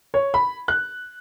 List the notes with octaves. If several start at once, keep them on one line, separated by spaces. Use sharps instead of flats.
C#5
B5
F#6